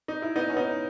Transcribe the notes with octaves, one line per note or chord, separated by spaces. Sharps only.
D#4
E4
B3 D#4
C#4
B3 D#4